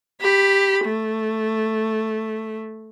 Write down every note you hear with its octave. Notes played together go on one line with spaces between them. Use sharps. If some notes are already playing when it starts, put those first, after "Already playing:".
G4 B5
A3